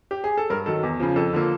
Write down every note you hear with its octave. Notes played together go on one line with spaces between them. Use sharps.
G4
G#4
A4
G2 A#4
D#3 F#3 A4
E2
C#3 F3
F2 A4
D3 F3 A#3